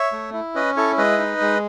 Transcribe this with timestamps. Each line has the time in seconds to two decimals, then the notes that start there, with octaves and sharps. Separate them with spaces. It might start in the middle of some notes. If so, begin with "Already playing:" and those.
Already playing: C#5 E5
0.12 A3
0.33 E4
0.55 C#4 B4 D#5
0.76 E4 A4 C#5
0.97 G#3 B4 D#5
1.19 D#4
1.41 G#3